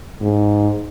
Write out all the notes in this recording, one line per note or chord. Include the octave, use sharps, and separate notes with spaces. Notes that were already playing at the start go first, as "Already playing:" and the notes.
G#2